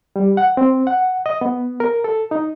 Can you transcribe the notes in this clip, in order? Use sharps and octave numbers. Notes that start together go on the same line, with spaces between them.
G3
F#5
C4
F#5
D#5
B3
A#4
A4
D#4